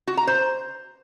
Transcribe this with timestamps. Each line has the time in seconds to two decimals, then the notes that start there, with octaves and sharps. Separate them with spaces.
0.07 F#4
0.17 A#5
0.27 C5